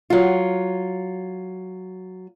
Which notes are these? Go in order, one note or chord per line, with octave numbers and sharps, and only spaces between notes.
F#3 F4